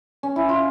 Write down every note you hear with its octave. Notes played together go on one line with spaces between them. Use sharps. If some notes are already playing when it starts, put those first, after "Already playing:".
C#4
E4
F4